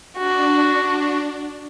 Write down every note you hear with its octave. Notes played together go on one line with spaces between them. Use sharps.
D4 F#4